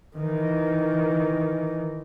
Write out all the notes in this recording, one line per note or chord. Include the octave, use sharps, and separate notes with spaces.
D#3 E3